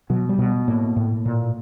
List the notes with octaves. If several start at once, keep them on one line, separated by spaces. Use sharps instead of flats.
B2 F#3
G3
B2
A2 A#3
A2
A#2